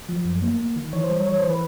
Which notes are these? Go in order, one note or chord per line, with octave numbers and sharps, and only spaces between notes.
F3
F#2
A#3
A#3
D#3
E3 C#5
C5
G3
C#5
E3 C#5
C5
E3
B4